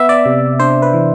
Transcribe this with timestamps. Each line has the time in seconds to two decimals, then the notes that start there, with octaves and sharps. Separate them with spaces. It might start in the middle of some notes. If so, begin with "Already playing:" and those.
Already playing: B3 E5
0.09 D5
0.26 C3
0.60 D4 C5
0.82 B4
0.94 E3